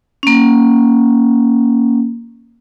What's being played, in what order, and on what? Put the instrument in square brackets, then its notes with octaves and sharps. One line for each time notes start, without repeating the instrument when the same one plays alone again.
[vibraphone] A#3 C#4